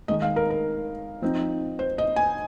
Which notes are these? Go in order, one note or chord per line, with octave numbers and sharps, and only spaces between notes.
D#3 G#3 D#4 D#5
F5
A#4
A#4
F3 C4 D#4
C5
D#5
G#5